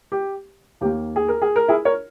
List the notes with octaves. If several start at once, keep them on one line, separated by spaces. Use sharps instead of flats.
G4
D#2 D#3 A#3 G4
G#4
A#4
G#4
A#4
E4 G#4
A#4 C#5